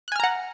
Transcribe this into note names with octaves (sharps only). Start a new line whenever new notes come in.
F#5 G#5 A#5 F6 F#6